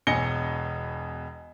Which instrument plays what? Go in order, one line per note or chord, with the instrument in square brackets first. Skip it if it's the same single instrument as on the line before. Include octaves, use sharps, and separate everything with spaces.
[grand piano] E1 B2 G#5 A#6 C#7 G7